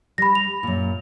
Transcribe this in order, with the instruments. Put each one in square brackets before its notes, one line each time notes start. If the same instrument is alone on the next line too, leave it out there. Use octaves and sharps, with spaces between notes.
[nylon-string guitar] G3 [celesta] B5 A#6
[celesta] F7
[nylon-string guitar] F#2 A#2